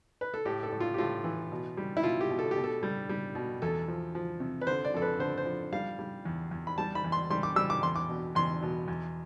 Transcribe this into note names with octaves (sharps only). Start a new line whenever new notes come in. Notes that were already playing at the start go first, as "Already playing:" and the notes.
B4
A4
A2 G4
A4
A2
F4
G4
A2 F4
E3
B2
G3
E4
B2 F4
G4
B2
A4
G4
B2
A4
G3
G3
B2
E2 A4
F3
F3
C3
B4
D3 C5
D5
F2 A4
B4
D3 C5
C5
F3
G3 F5
G3
E2
E2
B5
G3 A5
B5
E2
C6
G3 C6
D6
G3 E6
D6
E2 C6
D6
B2
E2 C6
B2
E2